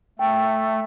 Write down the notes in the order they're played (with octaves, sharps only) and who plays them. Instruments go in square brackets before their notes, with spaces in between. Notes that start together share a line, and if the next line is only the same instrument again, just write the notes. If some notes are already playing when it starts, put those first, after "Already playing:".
[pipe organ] A3 [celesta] G5